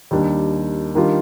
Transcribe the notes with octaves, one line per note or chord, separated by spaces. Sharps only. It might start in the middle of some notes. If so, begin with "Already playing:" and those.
D#2 D#3 G3 D4
D#3 G3 D4 F4